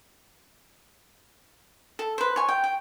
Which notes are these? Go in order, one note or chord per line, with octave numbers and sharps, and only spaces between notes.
A4
B4 C5
C#5 G#5
G5
G5